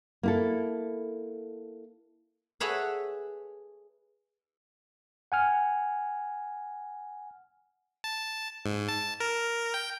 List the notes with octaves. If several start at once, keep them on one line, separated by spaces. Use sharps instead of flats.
A#3 E4 A4
G#4 A4 B4 C#5 E5 F#5
F#5 G#5 F6
A5
G#2
A5
A#4
G5